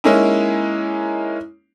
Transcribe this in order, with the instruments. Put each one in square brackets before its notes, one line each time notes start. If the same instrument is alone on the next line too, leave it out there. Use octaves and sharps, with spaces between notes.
[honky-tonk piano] G#3 A#3 C#4 D#4 E4